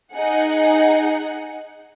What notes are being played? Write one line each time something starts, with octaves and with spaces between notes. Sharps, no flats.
D#4 G#4 F#5